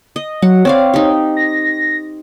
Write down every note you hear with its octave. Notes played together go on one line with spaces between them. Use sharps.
D#5
F#3 F#5
C4 C#5 D5 F5
D#4 G4
A#6